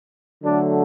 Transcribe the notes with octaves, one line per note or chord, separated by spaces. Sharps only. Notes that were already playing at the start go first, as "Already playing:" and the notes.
D3 F#3 A3 D4